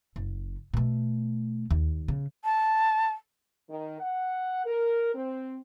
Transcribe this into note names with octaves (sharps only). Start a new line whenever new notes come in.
F#1
B2 A3
D#2
C#3
A5
D#3
F#5
A#4
C4